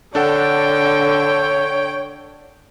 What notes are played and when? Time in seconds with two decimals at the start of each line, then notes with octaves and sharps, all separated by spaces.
0.15 D3 D4 A4 C#5 F#5 G5